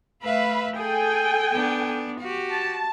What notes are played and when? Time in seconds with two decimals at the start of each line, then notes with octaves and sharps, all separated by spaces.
0.23 A3 B4 E5 F5 B5
0.77 G#4 A4 G5 G#5
1.52 B3 D4
2.20 F#4 G4
2.51 A5